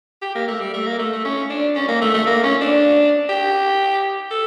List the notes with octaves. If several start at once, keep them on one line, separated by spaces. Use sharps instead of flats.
G4
A#3
A3
G3
A3
A#3
A3
A3
C#4
D4
C#4
A#3
A3
A3
A#3
C#4
D4
G4
A4